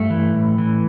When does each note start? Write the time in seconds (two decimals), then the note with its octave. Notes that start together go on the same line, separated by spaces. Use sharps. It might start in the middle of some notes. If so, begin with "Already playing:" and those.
Already playing: G2 A3
0.10 E3
0.34 A2
0.58 E3